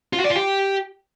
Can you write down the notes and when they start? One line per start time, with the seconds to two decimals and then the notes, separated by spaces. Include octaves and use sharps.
0.13 F4
0.19 F#4
0.24 D5
0.30 F4
0.36 G4